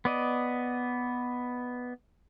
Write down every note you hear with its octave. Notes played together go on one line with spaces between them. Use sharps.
B3 D5 D#5